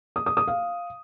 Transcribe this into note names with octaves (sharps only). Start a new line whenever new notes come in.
D#6
D#6
D#6
F5